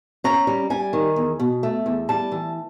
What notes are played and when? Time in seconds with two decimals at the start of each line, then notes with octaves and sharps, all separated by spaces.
0.24 C#4 A#5
0.47 G3
0.70 G3 G#5
0.93 D#3
1.16 E2
1.39 B2
1.63 A3
1.86 E2
2.09 G3 A5
2.32 E3